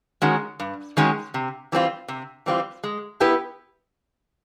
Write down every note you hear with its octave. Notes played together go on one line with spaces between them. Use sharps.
D#3 G#3 C#4 F#4
G2
D#3 G#3 C#4 F#4
C3
E3 G3 C4 F4
C3
E3 G3 C4 F4
G#3
B3 E4 G4 B4